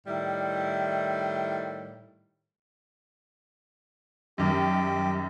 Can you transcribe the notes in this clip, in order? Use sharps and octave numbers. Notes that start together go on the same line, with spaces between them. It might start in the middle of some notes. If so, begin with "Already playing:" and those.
A2 D#3 G3 E4
F#2 D#3 G3 G4